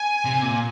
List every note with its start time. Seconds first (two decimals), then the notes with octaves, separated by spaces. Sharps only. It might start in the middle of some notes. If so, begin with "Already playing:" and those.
Already playing: G#5
0.25 C3
0.42 A#2